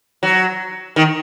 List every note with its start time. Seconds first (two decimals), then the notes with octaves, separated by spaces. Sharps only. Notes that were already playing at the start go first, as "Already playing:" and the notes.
0.23 F#3
0.96 D#3